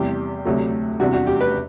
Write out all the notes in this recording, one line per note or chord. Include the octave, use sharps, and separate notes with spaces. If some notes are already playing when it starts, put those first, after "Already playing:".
Already playing: E2 C3 G3 G4
D2 C3 F#3 A3
E2 C3 G3 D4 F#4
F#4
G4
B4